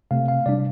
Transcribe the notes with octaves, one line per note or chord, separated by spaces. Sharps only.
C3 A3 C4 F5
F5
C3 G3 D4 D5